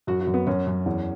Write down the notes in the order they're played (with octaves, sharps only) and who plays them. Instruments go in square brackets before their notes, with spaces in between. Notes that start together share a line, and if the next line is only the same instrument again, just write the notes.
[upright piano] F#2 F#4
F#4
F#2
B3
F#2 C#4
F#2
E2